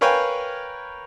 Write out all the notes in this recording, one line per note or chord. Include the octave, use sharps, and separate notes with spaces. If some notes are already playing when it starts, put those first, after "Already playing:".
A#4 B4 C#5 F5 G5 G#5